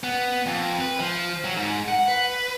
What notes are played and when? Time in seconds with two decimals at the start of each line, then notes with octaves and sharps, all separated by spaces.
0.04 B3
0.46 F2
0.81 B4
1.00 F3
1.44 F#3
1.57 G#2
1.88 F#5
2.08 B4